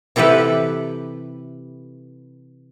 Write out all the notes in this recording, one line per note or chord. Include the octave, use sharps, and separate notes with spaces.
C3 E3 G4 A4 B4